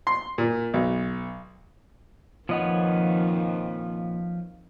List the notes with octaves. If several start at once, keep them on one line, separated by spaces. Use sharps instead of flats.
C6
A#2
B1
F2 A#2 D#3 F3 B4 C#5 D#5 F#5